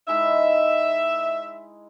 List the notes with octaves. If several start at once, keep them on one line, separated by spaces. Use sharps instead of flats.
G#3 D#4 E4 E5